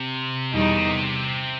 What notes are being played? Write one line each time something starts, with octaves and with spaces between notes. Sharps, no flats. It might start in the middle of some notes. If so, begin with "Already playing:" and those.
Already playing: C3
E2 B2 D#3 G3 D#4
C3